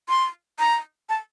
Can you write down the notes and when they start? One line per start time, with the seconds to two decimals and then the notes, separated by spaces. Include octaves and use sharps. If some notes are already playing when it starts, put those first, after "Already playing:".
0.09 C6
0.59 A#5
1.09 A5